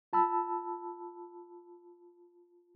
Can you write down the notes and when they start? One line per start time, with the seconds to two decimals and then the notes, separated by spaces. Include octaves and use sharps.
0.13 F4 A5 B5 E6